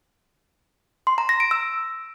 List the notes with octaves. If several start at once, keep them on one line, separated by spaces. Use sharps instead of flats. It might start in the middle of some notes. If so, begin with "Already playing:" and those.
C6
A#5
A#6
D7
E6